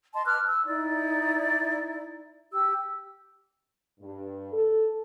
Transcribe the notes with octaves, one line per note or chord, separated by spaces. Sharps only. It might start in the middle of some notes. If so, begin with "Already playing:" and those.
D#5 A5 C6
B4 D6 F6 F#6
E6
D#4 E4 D5
G4 E6
G2
A4